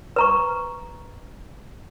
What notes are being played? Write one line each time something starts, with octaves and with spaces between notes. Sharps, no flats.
B4 A#5 C#6